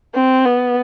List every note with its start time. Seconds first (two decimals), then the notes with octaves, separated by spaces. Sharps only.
0.15 C4
0.45 B3